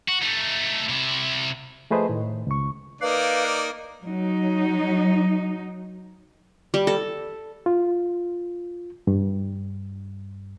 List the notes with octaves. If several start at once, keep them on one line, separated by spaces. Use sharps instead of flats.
F#4
A3 D#4
C3 E4
F3 A3 G#4 B4 C5 D#5
A2 D#3
C#2 C#6
A#3 D#4 B4 D5 F5
F#3 D#4
G3
A4
F4
G2